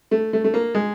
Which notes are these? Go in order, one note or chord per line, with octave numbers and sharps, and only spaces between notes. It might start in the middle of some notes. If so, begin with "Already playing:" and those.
A3
A3
A3
A#3
G#3